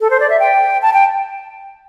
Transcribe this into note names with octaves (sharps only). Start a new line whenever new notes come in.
A4
C5
D5
E5
G5
A5
G5